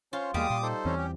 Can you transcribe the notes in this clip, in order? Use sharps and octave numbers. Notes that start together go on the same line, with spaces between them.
C#4 F4 C5 C#5
E2 G3 G#3 A#3 F5 D6 D#6
A#2 F4 C6
D#4 A4 C5
E2 E3 C4 C#4
G4